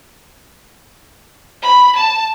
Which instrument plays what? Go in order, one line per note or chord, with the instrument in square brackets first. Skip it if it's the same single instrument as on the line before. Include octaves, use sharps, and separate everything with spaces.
[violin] B5
A5